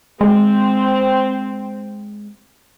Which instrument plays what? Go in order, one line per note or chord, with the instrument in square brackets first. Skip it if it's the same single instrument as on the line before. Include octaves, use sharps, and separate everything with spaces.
[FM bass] G#3 [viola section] C4